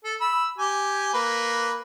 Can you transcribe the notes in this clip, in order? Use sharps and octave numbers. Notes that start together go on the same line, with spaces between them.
A4
B5 E6
G4 G#5
A#3 B4